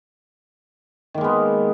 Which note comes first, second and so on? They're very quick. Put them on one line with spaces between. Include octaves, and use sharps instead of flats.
D#3 A#3 G#3 B3